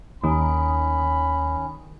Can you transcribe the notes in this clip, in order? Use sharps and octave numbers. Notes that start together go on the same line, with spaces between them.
D#2 D#3 C#4 B5